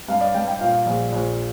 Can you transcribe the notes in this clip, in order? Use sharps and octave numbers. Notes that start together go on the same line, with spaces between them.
G2 F5
D5
G2 G5
G5
A#2 F5
A#1
A#1